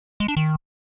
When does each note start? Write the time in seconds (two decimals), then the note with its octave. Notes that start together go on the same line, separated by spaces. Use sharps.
0.20 G#3
0.28 D4
0.37 D#3